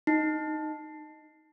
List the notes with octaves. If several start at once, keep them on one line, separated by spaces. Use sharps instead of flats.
D#4